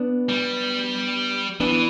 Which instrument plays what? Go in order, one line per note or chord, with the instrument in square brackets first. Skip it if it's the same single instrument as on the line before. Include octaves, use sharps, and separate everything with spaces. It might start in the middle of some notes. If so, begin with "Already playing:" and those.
Already playing: [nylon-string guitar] B3 D4
[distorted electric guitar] G3
[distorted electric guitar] E3 [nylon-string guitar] B3 D4